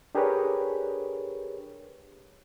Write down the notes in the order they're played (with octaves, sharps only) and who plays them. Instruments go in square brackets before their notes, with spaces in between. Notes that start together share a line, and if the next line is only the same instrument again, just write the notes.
[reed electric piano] D4 G4 G#4 A#4 B4 C#5